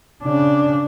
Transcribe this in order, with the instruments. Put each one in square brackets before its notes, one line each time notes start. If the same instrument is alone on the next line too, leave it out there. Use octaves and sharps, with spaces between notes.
[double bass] C#3 D4